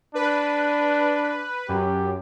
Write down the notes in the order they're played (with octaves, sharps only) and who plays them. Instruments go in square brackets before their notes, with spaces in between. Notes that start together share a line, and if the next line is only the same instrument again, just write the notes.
[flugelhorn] D4 [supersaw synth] B4
[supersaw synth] F#2 [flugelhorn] G4